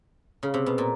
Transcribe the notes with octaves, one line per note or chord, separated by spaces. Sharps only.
C#3
C3
B2
A#2